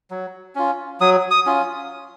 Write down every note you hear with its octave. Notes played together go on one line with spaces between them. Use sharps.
F#3
C#4 F4
F#3 D#6
D#6
C#4 F4